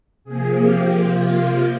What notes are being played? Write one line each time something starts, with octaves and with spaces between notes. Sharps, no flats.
C3 F3 A#3 G#4
G4
F4